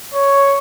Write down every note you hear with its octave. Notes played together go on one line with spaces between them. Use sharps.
C#5